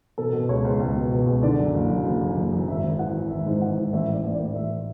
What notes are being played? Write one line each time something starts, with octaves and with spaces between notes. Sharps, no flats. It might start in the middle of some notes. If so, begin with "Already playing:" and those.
B2 A4
B2
C#2 C#5
C#2
C#2
B2
B2
C#2
D3 D5
F#2
F#1
F#2
F#1
F#2
F#1
F#2
G#1 E5
G#1
E3 F#5
E3
G#1 E5
G#2
E3 F#5
G#2
A1 E5
E3
D5
A1
D5
A1
A1 E5